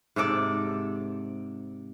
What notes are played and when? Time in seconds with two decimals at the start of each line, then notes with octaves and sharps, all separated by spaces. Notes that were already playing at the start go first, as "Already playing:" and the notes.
0.16 G#2 C3 A4 D5